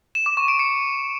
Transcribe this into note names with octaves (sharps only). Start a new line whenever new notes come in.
E7
D6
C#6
D7
C#7